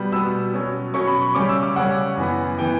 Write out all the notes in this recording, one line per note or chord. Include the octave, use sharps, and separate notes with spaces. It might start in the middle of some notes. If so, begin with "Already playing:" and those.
Already playing: B2 G3 B3
B2 G3 B3 E6
B2 F#3 C#4
B2 F#3 C#4 C#6
B5
C#6
C#3 G3 C#4 D6
E6
D6
C#3 G3 C#4 F#5
F#2 E3 B3
E3 B3 G5